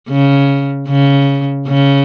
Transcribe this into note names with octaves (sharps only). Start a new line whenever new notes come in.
C#3
C#3
C#3